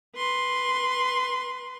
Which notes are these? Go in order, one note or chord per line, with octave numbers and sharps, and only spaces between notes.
B4 C6